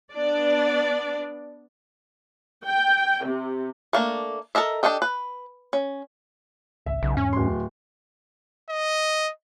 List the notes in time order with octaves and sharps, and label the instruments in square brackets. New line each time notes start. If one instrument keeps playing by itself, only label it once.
[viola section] B3 D4 D5
[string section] G5
C3
[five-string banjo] A3 A#3 D4
A4 A#4 D#5 E5
D4 G4 A4 D#5 G5
B4
C#4
[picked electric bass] G#1 C#2 [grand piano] E5
[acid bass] B1 [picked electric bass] C#3
[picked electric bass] E2 G#2 [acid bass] C#4
[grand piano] D1 C6
[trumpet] D#5